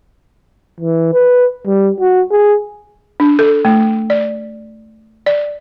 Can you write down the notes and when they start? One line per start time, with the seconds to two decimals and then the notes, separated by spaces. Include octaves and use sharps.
0.81 E3
1.13 B4
1.67 G3
2.00 F#4
2.31 G#4
3.20 D4
3.39 A4
3.65 A3
4.10 D5
5.26 D5